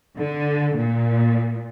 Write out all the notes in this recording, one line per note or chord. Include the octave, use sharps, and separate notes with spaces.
D3
A#2